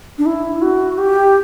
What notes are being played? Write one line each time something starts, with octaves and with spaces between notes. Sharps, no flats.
D4
E4
F#4
G4